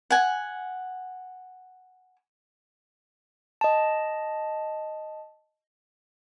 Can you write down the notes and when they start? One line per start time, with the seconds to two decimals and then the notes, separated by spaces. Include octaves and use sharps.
0.10 F#5 G#5
3.61 D#5 A5